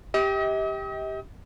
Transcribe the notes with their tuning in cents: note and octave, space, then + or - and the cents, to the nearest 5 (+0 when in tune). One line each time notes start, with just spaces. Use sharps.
G4 +0 D#5 +45